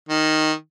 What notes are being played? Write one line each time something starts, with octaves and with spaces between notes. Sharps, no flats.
D#3